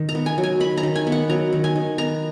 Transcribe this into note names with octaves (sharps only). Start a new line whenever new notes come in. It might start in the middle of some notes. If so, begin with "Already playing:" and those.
Already playing: D#3
A#5
B3
G#5
F#3
G#5
D#3 B5
A#5
D#3
G#5
B3
F#5
F#3 A#5
D#3
G#5
D#3
B3 A#5